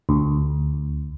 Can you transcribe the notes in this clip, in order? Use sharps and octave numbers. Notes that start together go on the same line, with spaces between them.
D2